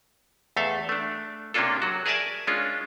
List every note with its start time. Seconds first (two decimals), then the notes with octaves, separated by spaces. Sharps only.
0.57 E2 A3 A4 E5 F5
0.89 A3 D4
1.54 C3 A#3 C#4 D4 F4 A4
1.82 F#3 F#4
2.06 G#4 A#4 D5 E5 G#5 A5
2.47 G#3 C#4 D4 F4